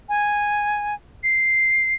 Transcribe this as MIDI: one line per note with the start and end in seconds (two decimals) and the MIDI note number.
0.09 0.94 80
1.24 1.95 96